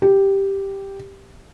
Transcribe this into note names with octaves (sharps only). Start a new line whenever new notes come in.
G4